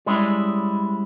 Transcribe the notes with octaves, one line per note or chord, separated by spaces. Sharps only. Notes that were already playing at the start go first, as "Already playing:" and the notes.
G3 G#3 C#4 E4